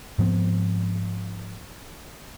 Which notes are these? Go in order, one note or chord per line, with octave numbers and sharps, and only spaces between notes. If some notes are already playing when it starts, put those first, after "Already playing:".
G#2 F3 B3 C4